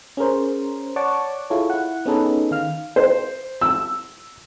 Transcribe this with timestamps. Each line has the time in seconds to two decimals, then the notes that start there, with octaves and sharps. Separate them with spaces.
0.17 C#4 G#4 A#4 C5
0.96 C#5 D5 F#5 A5 C#6 D6
1.50 E4 F4 G#4 A4 C#5
1.70 E4 F#5
2.05 B3 C#4 D#4 G#4 A4 B4
2.51 D#3 F5 F6
2.96 C5
3.61 E6